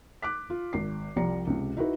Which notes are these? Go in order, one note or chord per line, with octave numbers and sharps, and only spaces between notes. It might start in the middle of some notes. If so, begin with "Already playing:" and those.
D6 F#6 B6
F4
G#1 C7
C2 F3 G3 D5 A#5 C#7
C#2 C3
D#4 E4 F#4 B4